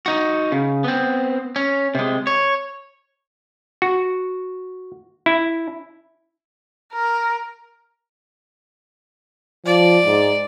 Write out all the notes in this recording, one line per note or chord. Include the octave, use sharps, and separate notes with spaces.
D#4 F#4
C#3
B3 C4
C#4
C3 G#3
C#5
F#4
E4
A#4
F3 D5
G#2